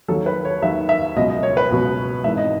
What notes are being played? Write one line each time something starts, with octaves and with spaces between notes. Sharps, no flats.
D#2 D#3 F#3 A4
B4
C#5
D#2 D#3 F#3 E5
E5
C#2 B2 F#3 D#5
D#5
C#5
B4
C#2 B2 F#3
G#1 G#2 E3 E5
D#5